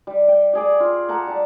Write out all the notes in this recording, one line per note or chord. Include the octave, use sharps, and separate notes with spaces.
G3
G5
G4 G#4 D5
F4
F#5 A5 A#5
G3 A5